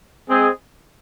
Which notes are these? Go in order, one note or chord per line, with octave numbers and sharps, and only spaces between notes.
G#3 C4 G#4